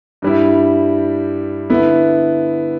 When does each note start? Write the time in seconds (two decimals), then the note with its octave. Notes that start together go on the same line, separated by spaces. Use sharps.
0.22 G2 G3 E4
1.70 D3 B3 E4